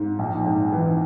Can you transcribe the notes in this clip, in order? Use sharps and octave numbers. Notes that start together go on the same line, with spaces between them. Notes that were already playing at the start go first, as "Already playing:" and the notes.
Already playing: G#2
A#1
G#2
E3